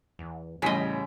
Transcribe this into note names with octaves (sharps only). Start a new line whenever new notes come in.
E2
A1 A2 C#3 G3 D#5 B6